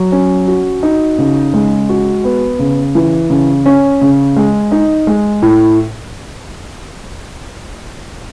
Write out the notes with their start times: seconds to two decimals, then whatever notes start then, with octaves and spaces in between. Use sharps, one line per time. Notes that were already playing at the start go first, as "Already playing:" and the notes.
Already playing: F#3
0.12 C#4
0.48 F#4
0.83 D#4
1.18 C#3
1.54 G#3
1.89 F#4
2.24 B3
2.59 C#3
2.95 E3
3.30 C#3
3.66 C#4
4.01 C#3
4.36 G#3
4.72 D#4
5.07 G#3
5.42 A2